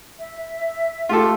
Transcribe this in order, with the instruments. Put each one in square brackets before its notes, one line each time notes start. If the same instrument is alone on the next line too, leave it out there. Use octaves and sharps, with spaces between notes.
[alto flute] E5
[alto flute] A3 [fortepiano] F4 G4 A4